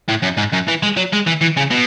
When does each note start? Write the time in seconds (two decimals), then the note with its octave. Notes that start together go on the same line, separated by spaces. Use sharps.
0.09 A2
0.23 F#2
0.38 G#2
0.53 F#2
0.68 E3
0.83 G#3
0.97 F#3
1.13 G#3
1.27 E3
1.41 E3
1.57 C#3
1.70 B2